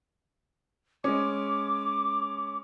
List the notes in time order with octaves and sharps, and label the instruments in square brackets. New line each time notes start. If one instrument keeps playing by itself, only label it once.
[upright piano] G#3 C#4 [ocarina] D6